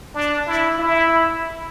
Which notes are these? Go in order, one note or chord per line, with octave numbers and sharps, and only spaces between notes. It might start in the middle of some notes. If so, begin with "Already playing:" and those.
D4
E4
E4